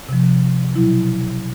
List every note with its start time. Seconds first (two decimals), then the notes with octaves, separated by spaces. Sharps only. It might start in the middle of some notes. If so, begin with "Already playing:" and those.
0.09 C3 F3
0.74 B2 F#3 E4